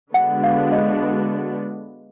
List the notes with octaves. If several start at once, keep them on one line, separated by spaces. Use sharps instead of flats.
D3 G#3 B3 D4 F#4 F#5
F5
D#5